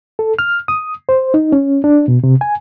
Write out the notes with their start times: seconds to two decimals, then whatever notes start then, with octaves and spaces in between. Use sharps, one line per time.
0.19 A4
0.39 F6
0.68 D#6
1.09 C5
1.34 D#4
1.52 C#4
1.84 D4
2.08 B2
2.24 C3
2.41 G#5